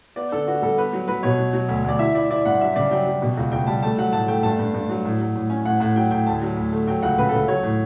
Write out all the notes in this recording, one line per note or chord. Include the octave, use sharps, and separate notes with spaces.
B3 D5
D3 A4
B3 F#4
G3 A4
B3 B4
F#3
F#3 B4
B2 C#5
F#3
F#3
D2
D2 D5
E4 E5
E4 D5
E4 D5
G2 F#5
F#3 E5
C#3 D5
F#3 G5
F#3
B2
C#2
C#2 G5
G3 A5
A3 A5
F#3 F#5
A2 A5
A3 G5
G2 A5
G2
G2
F#3
A2
F#3
A2
C#4
A2 F#5
A2 F#5
F#3 G5
A2 G5
D2 A5
F#3
D2
A3
F#3 G5
C#2 F#5
C#3 B4
A4
C#3 B4
F#3 C#5
A2